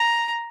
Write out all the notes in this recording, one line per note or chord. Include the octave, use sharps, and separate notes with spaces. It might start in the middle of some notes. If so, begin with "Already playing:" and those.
Already playing: A#5